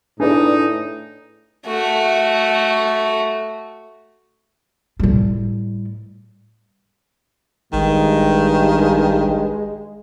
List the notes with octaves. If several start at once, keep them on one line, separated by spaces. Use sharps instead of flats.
A2 D4 D#4 G#4 B4 D5
A3 F#4
A2 G3
A1 G2 D#3 G#3